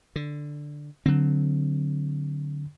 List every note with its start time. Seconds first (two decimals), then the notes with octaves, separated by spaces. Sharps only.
0.16 D3
1.06 D3 F#3 C4